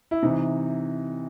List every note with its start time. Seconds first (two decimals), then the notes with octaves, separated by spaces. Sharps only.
0.11 E4
0.22 C3 E3 D#4